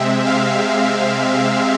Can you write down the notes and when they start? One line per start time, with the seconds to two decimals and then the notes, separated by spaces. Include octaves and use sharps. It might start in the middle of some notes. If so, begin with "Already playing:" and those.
Already playing: C3 G#3 C4 E5
0.26 F5